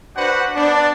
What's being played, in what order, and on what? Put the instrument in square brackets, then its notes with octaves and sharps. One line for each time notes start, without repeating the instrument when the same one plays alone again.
[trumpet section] D4 F#4 B4 C5 F#5
B3 D4